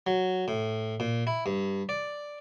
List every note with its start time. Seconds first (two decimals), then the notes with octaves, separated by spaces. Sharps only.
0.07 F#3
0.48 A2
1.00 A#2
1.27 E4
1.46 G2
1.89 D5